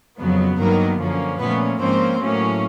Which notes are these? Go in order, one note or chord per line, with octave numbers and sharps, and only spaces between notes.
F2 C#3 F#3 B3
G2 D#3 F#3 A#3 B3 A#4
F#2 D3 F3 A#3 C#4
A#2 F3 A3 B3 C#4 B4
G#2 F3 A#3 C4 C#4 C5
A2 F#3 A#3 C#4